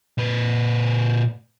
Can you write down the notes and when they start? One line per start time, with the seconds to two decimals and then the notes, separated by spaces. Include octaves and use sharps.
0.18 A#2 B4